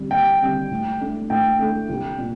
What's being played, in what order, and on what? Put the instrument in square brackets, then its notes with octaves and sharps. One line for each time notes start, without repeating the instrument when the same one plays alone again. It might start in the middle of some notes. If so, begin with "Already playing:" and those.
Already playing: [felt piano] D3 G3 C4
[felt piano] D#2 [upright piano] G5
[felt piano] D3 G3 C4
A2
A3 D4 A4
[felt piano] A2 [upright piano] G5
[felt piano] A3 D4 A4
C2
A#2